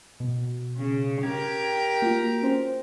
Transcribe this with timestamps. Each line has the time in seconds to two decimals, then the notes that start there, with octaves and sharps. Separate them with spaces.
0.20 B2
0.77 C#3
1.23 G4 A#4 G5 G#6
2.02 A#3 F4 F#4
2.43 C#4 C5